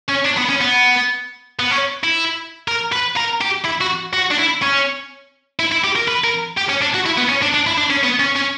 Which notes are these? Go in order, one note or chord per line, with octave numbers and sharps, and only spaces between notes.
C#4
D4
B3
C#4
B3
B3
C#4
E4
A#4
B4
A#4
G4
E4
F#4
F#4
D4
E4
C#4
E4
E4
G4
A#4
B4
A#4
G4
C#4
D4
F#4
E4
B3
C#4
D4
D4
E4
D4
C#4
B3
C#4
C#4